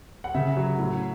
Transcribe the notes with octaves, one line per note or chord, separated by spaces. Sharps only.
F#5
C#3 E5
F#3
A2